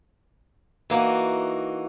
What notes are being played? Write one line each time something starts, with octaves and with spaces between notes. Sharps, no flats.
E3 A#3 D#4 F#4